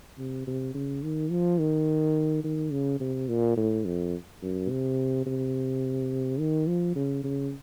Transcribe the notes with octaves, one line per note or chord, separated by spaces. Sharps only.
C3
C3
C#3
D#3
F3
D#3
D#3
C#3
C3
A#2
A2
F2
F#2
C3
C3
D#3
F3
C#3
C#3